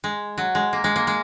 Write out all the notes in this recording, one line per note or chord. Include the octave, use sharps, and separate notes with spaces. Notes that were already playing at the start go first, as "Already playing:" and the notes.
G#3
F#3
G#3
A#3
G#3
A#3
G#3